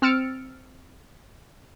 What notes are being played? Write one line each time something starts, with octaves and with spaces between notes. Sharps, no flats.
C4 E6 F6 A6 C#7 D7